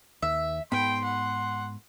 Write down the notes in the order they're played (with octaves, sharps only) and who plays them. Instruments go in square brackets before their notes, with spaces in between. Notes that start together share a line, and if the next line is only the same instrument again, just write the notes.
[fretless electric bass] D#2 [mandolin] E5
[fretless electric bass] G#2 B3 [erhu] G5 [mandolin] B5 [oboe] C6
[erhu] F#5